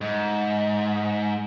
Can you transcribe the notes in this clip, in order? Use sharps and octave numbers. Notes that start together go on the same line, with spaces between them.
G#2